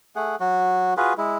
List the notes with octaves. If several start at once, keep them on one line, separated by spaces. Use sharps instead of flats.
A3 G#4 F#5
F#3 F#4
F4 F#4 G#4 B4
G#3 E4